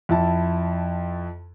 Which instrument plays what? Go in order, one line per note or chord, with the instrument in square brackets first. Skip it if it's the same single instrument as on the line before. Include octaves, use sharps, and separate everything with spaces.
[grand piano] F2 E4 A5